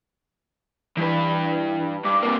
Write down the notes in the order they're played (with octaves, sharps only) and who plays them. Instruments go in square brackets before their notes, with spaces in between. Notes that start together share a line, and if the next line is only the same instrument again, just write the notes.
[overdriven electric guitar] G2 B4 [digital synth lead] E3
[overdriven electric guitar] G2 [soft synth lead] D6
[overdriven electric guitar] C3 A#3 [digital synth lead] B4